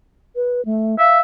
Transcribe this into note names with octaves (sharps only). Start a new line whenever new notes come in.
B4
A3
E5 F5